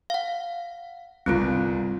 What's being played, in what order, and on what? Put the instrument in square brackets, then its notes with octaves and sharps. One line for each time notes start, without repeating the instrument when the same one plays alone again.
[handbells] F5 F#5
[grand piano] G1 C2 [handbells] C4 F4